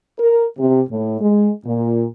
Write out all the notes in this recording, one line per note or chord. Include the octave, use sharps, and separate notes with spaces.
A#4
C3
A2
G#3
A#2